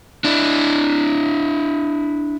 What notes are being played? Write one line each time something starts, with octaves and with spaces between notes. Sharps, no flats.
D4 E4